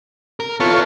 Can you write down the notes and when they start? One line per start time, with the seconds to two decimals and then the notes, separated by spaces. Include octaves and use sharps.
0.40 A#4
0.60 B3 E4 F4 A4 C#5